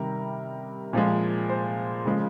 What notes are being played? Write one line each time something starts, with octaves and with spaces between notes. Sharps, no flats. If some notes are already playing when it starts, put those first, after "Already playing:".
Already playing: C3 D#3 G3 A#4
A#2 F3 G#3
C5
C#3 F3 G#3